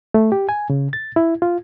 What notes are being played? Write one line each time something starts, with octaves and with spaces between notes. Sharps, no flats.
A3
G4
G#5
C#3
A6
E4
F4